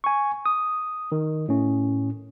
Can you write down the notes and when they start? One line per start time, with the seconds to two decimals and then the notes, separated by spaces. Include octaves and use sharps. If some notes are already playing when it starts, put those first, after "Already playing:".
0.04 G#5 C#6
0.46 D#6
1.12 D#3
1.48 A2 C#4